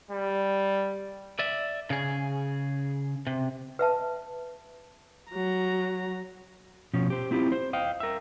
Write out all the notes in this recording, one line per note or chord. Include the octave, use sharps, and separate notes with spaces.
G3
D5 E5
C#3 G#4
C3
B4 E5 A5
F#3 A#5
B2 F3 C#4
G4 C5
C4 E4 F4 G4
C5
D#5 F5 G5
A#4 E5